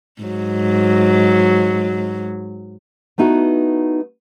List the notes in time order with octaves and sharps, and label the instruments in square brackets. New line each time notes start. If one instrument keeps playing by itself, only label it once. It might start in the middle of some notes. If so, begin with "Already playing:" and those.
[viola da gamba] G#2 F#3
[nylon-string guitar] A3 B3 D#4 E4 F#4